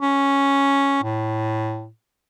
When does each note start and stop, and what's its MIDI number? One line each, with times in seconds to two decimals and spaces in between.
0.01 1.01 61
1.03 1.89 45